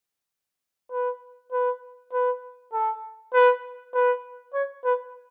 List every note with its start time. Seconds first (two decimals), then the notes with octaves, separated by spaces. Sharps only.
0.92 B4
1.52 B4
2.13 B4
2.73 A4
3.34 B4
3.94 B4
4.54 C#5
4.84 B4